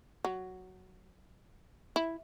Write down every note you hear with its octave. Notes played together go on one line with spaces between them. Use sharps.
F#3
E4